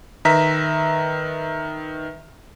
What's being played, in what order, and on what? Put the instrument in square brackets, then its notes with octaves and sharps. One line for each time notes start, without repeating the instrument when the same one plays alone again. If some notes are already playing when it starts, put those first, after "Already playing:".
[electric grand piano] D#3 B4 E5 A#5 B6